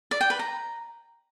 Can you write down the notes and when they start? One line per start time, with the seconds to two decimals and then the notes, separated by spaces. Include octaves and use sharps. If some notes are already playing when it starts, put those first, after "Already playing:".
0.11 D5
0.21 G5
0.30 B4
0.39 A#5